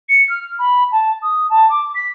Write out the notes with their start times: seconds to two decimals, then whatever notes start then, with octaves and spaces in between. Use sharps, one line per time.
0.09 C#7
0.29 F6
0.59 B5
0.92 A5
1.22 D#6
1.50 A5
1.69 D6
1.95 B6